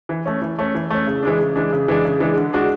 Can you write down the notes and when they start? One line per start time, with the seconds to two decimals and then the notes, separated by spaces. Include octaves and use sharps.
0.09 E3
0.25 A3 C#4
0.42 E3
0.59 A3 C#4
0.75 E3
0.90 A3 C#4
1.07 C#3
1.23 E3 G#3 D4
1.39 C#3
1.56 E3 G#3 D4
1.73 C#3
1.88 E3 G#3 D4
2.05 C#3
2.20 E3 G#3 D4
2.37 D3
2.53 G#3 D4 F#4